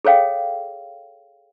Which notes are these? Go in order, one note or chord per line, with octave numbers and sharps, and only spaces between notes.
G#4 A4 C#5 F5 G5